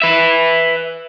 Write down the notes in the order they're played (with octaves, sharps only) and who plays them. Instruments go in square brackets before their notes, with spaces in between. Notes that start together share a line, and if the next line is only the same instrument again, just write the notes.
[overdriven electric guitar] B4 E5